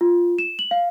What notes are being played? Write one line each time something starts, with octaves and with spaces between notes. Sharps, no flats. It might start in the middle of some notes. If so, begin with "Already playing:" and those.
F4
E7
F#7
F5